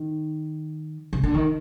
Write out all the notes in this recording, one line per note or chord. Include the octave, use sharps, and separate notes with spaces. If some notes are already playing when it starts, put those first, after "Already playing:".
Already playing: D#3
C#3
D3
D#3